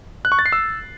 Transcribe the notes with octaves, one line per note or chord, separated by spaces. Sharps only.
F#6
C#6
A6
C7
E6